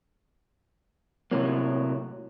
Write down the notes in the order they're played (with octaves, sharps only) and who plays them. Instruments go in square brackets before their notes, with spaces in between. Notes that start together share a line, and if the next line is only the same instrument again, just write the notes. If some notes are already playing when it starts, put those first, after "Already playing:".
[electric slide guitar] A2 C3 F#3 A#3